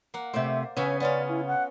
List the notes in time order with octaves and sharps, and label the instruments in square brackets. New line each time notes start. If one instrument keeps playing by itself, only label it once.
[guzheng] A#3 F#5
[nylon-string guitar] C3 A3 [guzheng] C5 D5 [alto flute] E5
[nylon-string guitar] C#3 [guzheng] B3 C#4 E5 [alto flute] C#5
[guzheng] B3 C#4 F4 [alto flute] D5
[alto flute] E4
F#5